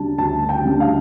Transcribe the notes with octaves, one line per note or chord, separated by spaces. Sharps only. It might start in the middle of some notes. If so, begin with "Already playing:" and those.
Already playing: D2 C#3 G3 D4 A5
D2 A5
G5
C#3 G3 D4
F5